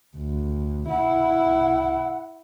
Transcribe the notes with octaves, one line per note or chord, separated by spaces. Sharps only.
D2
E4 F#5